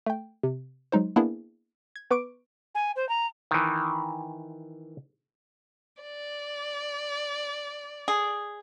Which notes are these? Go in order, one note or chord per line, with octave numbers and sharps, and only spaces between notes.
A3 G5
C3
F#3 G#3 D#4 C5
A#3 B3 D4 E4 G#4
G#6
B3 B4 C#6 D6 D7
G#5
C5
A#5
D#3 E3
D5
G#4